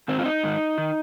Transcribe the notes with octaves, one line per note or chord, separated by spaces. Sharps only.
G#2 D#3 C4
F4
D#4
G#2 D#3
D#3